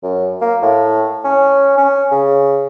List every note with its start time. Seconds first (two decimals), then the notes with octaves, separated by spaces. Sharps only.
0.03 F#2
0.41 A#3
0.62 A2
1.24 C#4
1.78 C#4
2.11 C#3